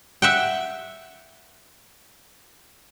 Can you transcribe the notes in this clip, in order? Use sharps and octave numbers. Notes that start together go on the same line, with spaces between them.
E5 F#5 G5